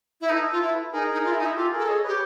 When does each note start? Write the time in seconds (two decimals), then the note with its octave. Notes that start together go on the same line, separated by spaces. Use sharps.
0.21 E4
0.29 D#4 A4 B4
0.52 F4
0.62 E4
0.93 D#4 G#4 A#4
1.13 D#4
1.25 F4
1.31 E4
1.39 D#4
1.46 E4
1.56 F4 G4 A4
1.72 G#4 A#4
1.79 A4
1.88 G#4 C#5 D#5
2.04 G4 B4 C#5